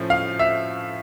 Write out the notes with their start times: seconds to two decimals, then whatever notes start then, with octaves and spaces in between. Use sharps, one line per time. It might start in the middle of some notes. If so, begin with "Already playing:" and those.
Already playing: A2 F3 A3 C#4
0.10 F5
0.39 E5